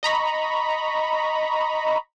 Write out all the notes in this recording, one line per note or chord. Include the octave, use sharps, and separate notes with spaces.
D#5 A#5 B5 C#6